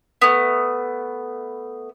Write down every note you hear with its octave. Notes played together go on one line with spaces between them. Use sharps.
A3 B3